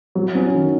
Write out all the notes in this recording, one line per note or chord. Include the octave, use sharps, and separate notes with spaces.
F#3
C#4
D#3